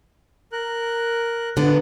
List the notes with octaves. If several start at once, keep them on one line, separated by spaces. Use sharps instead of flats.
A#4 F#6
D3 B3